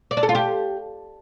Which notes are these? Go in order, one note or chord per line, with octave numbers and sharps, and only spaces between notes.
D5
D4
A4
F4
G4